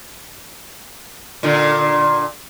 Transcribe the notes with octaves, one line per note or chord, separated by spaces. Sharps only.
A#2 D3